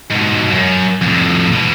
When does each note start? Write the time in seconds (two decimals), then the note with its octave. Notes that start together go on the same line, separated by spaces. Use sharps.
0.10 G#2 B2
0.51 F#2
1.02 F2 A2
1.52 B2 E3